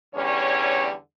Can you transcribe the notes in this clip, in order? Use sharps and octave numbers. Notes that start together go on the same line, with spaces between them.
E2 D3 G3 C#4 C#5